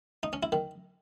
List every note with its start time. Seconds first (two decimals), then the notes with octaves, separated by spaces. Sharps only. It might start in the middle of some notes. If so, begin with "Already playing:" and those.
0.23 D#4
0.33 C#4
0.43 E4
0.52 D#3